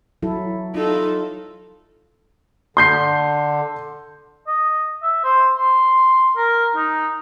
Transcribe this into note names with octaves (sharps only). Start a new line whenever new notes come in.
F#3 E4 A4
D#4 F4 A4
D3 C6 G6 C7
D#5
E5
C5
C6
A#4
D#4